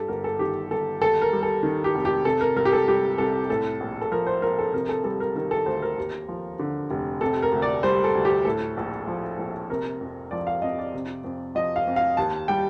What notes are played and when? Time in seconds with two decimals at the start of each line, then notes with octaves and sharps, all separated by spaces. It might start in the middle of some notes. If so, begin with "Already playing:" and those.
Already playing: G2 G4 A4
0.08 G1 A#4
0.24 A4
0.39 D#3 G4
0.71 G1 A4
1.01 D#2 A4
1.22 A#4
1.33 G3
1.43 A4
1.63 D#3
1.84 G4
1.95 F1
2.05 G4
2.25 C3 A4
2.41 A#4
2.56 C2 A#4
2.65 G4
2.73 A4
2.88 G3 G4
3.18 C2 A4
3.49 A2 A4
3.80 A#1
4.02 A4
4.11 F3 A#4
4.27 C5
4.42 A#1 A#4
4.58 A4
4.73 C3 A#4
4.89 A4
5.04 G3 A4
5.20 A#4
5.36 D#3 A#4
5.51 A4
5.66 D2 C5
5.82 A#4
5.98 D#2
6.28 F3
6.59 D3
6.91 F1
7.21 C3 A4
7.42 A#4
7.52 D2
7.62 D5
7.83 G3 C5
8.04 A4
8.15 D2
8.25 G4
8.45 A2 A4
8.77 A#1
9.07 F3
9.39 A#1
9.70 C3 A#4
10.01 F2
10.31 F3 D5
10.47 F5
10.62 F2 D#5
10.79 D5
10.94 C3
11.24 F2
11.55 F3 D#5
11.76 F5
11.87 F2
11.96 F5
12.17 D#2 A5
12.48 G3 G5